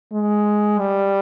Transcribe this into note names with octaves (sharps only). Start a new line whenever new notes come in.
G#3
G3